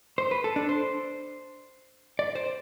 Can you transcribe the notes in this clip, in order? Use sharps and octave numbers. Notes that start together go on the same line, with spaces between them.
C5
B4
A4
D4
C5
D5
C5